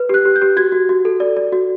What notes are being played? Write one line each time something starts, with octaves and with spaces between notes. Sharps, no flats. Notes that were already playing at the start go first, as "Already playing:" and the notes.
Already playing: B4
G4 F#6
G4
G6
G4
F#4 G#6
F#4
F#4
A4
D5
D5
F#4